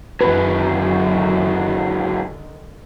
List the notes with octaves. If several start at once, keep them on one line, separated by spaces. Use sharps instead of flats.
C#2 F#2 D3 D#3 F#3 B4